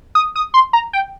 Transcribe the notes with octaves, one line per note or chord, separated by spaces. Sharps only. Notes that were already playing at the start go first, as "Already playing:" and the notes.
D#6
D#6
C6
A#5
G5